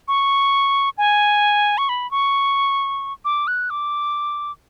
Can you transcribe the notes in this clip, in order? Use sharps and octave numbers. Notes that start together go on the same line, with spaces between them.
C#6
G#5
C#6
B5
C#6
D6
F#6
D6